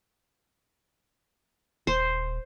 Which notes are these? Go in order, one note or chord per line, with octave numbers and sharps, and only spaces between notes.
D#1 C5